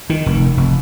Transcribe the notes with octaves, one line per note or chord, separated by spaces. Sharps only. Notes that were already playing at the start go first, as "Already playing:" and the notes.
D#3
F1
F1